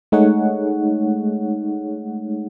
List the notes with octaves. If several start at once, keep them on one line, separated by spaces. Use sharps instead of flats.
G#3 A3 D#4 G#4 C#5 F#5